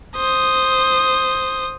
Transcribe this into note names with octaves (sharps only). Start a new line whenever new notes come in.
C5 D#6